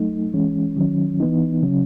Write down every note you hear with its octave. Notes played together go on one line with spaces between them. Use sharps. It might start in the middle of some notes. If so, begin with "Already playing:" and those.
Already playing: F#3 A3 D#4
E3 G#3 C#4
D#3 F#3 C#4
E3 B3 D#4
C#3 F#3 C#4